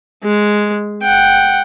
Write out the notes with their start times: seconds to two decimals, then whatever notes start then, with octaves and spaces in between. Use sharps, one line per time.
0.23 G#3
1.03 F#5 G5